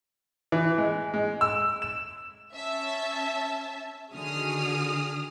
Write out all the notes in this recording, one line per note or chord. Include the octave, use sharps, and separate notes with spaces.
E3
G#3
G#3
E6
E7
C#4 E5 A5
D3 D#3 F#4 G#4 D#6 F6